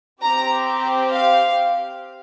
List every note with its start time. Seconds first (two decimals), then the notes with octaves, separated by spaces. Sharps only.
0.22 C4 G4 A#5
1.11 F5